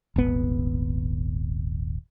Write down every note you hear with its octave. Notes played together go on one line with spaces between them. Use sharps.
D#1 G#1 B3